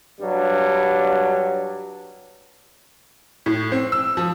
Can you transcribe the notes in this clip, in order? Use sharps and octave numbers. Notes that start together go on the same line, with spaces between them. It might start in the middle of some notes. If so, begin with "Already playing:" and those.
G2 F#3 G3
A2
C4
E6
F3